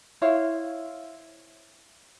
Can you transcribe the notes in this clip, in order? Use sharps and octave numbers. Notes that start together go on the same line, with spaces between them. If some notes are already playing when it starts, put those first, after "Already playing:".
E4 C5 C#5 F5